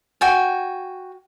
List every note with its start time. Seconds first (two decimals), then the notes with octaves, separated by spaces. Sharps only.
0.21 F#4 G5 G#5